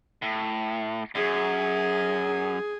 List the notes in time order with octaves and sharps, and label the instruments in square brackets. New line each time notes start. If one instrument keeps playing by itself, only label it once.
[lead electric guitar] A2
[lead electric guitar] F#2 [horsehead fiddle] G#4